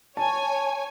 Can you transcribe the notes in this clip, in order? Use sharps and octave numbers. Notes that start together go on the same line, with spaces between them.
C#5 G#5 A5